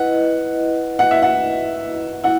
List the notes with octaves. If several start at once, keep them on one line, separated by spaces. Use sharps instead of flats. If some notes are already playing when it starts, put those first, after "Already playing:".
Already playing: E4 B4 D#5 F#5
F#5
E5
F#5
E4 F#5